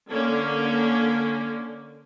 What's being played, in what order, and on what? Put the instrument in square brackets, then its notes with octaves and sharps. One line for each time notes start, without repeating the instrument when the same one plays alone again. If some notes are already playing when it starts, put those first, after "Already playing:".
[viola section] D3 A#3 C#4